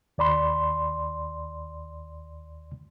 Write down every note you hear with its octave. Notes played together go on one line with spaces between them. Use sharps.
D#2 D5 B5 C6